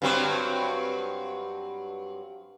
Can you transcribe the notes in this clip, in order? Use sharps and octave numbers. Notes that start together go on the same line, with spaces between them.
G2 F#3 C4